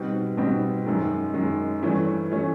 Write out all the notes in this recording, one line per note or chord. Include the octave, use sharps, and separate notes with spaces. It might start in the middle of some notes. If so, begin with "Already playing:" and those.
Already playing: B2 G3 C4 D#4
B2 G3 C4 D#4
F#2 D#3 G#3
F#2 D#3 G#3
G2 E3 A3 C#4
E3 A3 C#4